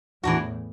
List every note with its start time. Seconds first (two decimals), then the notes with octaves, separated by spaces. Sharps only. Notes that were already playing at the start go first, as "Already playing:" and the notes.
0.23 E2 A2 E3 D4 F#4